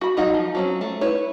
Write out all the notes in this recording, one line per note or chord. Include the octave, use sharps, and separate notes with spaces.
F#4 B5
F#3 D#4 F4 F#4
F3
F#3 C4 C#4
A3
E4 B4 C#5